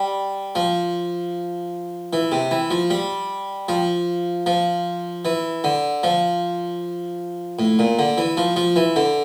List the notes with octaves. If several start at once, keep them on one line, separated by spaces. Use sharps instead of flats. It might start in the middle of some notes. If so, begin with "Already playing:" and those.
Already playing: G3
F3
E3
C3
E3
F3
G3
F3
F3
E3
D3
F3
A2
A#2
D3
E3
F3
F3
E3
D3